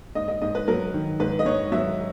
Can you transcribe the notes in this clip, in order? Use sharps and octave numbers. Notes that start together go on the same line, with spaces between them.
G#2 D#5
D#5
G#2 D#5
B4
F#3 A#4
D#3
G#2 B4
D#5
G#2 C#5
F#3 E5